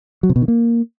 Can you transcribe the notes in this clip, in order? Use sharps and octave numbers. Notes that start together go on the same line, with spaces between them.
F#3
C3
B2
D#3
A#3